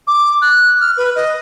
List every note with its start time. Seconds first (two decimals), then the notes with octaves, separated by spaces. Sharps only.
0.07 D6
0.42 F#6
0.81 F6
0.97 B4
1.16 D#5